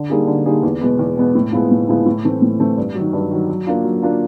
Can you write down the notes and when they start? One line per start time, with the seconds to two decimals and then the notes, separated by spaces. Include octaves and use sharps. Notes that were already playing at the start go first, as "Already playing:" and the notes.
Already playing: D3
0.10 G3 A#3 D#4 G#4
0.27 D3
0.46 G3 A#3 D#4 G#4
0.63 E2
0.81 B2 G#3 B3
0.99 E2
1.17 B2 G#3 B3
1.35 A2
1.52 F3 G#3 B3 E4
1.71 A2
1.89 F3 G#3 B3 E4
2.06 A2
2.25 E3 A3 C4
2.41 A2
2.60 E3 A3 C4
2.77 G2
2.95 D#3 F#3
3.13 G2
3.31 D#3 F#3
3.49 F#3
3.67 A#3 D4 F4
3.84 F#3
4.02 A#3 D4 F4